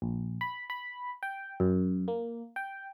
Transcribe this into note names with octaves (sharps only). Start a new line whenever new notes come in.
A#1
B5
B5
G5
F#2
A#3
G5